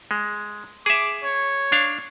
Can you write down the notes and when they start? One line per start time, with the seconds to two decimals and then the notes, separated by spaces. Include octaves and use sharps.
0.11 G#3
0.86 G#4 E5 D6
1.22 C#5
1.72 D4 F5